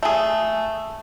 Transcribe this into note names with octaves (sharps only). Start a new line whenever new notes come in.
A3 G#4